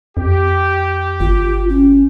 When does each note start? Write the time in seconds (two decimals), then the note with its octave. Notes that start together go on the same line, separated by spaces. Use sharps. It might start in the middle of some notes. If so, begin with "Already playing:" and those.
0.17 F2 G4
1.20 G1 F4
1.69 C#4